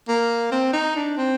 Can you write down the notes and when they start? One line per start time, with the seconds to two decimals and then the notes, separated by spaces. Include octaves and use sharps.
0.08 A#3
0.52 C4
0.73 D#4
0.96 D4
1.17 C4